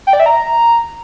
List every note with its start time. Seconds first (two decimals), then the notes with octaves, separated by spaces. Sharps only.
0.07 G5
0.13 D5
0.20 E5
0.26 A#5